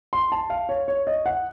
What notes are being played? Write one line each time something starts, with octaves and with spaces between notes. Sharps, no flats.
C6
A5
F5
C#5
C#5
D#5
F#5